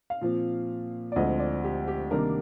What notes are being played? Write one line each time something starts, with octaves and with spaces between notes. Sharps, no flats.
F5
A#2 F3 C4
D5
D2 D3 F3 G#3 C4 D#5
D5
G4
G4
C3 D#3 G3 A#3 D4 A#4